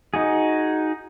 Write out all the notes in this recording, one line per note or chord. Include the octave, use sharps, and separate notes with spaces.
D#4 F#4 G#4